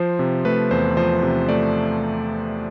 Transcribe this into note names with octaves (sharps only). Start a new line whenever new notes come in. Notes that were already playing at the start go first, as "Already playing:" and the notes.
Already playing: F3 C5
C3
A3 B4
E2 C5
F3 C5
C3
A3 D5